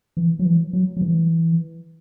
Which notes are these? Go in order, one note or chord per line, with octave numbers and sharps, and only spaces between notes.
E3
F#3
E3
F#3
F#3
E3